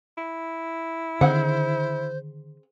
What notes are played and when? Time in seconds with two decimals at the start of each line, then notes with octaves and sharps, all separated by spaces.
0.18 E4
1.21 D3 D#3 C4 G#4 C5 F#5